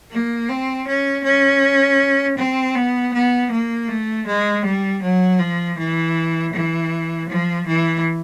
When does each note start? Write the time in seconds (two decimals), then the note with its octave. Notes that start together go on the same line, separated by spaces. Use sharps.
0.12 A#3
0.49 C4
0.87 C#4
1.24 C#4
2.37 C4
2.75 B3
3.13 B3
3.51 A#3
3.88 A3
4.27 G#3
4.65 G3
5.02 F#3
5.39 F3
5.77 E3
6.54 E3
7.29 F3
7.67 E3